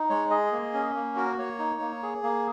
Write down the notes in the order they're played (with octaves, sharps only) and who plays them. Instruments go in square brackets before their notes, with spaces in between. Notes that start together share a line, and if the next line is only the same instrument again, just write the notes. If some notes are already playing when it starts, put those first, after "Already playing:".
Already playing: [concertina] D#4
G#3 C#5
G#4 D#5
A#3
C#4
A#3
F#4 A#4
A#3 C#5
D#4
A#3
G#4
A#3